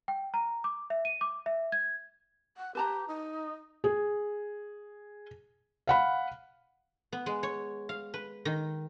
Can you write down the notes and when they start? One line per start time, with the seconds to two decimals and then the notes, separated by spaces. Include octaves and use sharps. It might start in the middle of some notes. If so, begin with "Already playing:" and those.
0.08 G5
0.34 A#5
0.64 D6
0.90 E5
1.05 D#7
1.21 D6
1.46 E5
1.72 G#6
2.57 F#5
2.75 G4 B4 A5 A#5
3.08 D#4
3.84 G#4
5.87 F5 F#5 B5
7.12 B3
7.26 G#3
7.43 C#5
7.89 F5
8.14 B4
8.45 D#3